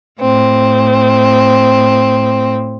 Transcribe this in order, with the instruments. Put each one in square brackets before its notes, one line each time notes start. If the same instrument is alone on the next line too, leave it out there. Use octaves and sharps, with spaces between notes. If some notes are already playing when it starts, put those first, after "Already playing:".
[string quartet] A2 C4